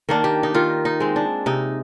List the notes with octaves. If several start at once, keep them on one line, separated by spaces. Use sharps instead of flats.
D#3 A#3 D4
G4
D#4
D#3 F4
D#4
G#3 C4
D4
C3 D#4